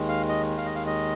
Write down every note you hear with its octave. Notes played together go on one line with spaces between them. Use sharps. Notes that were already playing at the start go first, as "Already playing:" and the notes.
Already playing: D#2 D#3 G#3
F5
D#5
F5
D#5
F5
D#5